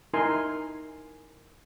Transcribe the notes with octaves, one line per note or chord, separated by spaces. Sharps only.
D#4 E4 A#4 G#5 C6